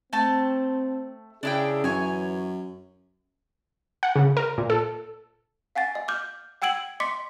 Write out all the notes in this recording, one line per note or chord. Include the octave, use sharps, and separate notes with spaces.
A3 C4 A5
C#3 D4 E4 G#4 G5
F#2 E3 C#5 G#5
F#5
C#3
A#4
A#2
A4
F5 F#5 G#5 A6
D#5
D6 F6 G6
F#5 G5 E6 G#6 D7 F#7
D#5 C6 D6 B6 C#7